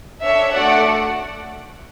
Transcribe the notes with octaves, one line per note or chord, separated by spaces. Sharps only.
D4 A4 C#5 E5
A3 D4 F#4 A4 D5 F#5